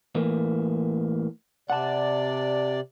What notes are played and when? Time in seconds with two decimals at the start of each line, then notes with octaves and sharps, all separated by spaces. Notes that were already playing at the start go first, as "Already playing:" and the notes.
0.15 A2 E3 A#3
1.70 C3 D5 F#5 A5